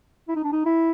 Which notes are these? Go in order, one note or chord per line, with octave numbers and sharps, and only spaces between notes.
E4
D#4
D4
D#4
E4